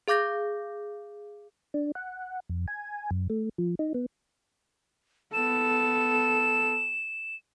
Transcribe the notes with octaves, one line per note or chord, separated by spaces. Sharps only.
G#4 F5 D6 G6 A#6
D4
F#5
F2
G#5
F#2
A3
F3
D#4
B3
B3 A4 E7